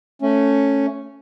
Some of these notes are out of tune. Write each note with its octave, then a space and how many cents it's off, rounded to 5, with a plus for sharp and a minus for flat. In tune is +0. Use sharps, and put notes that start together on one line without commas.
A3 +10 C#4 +0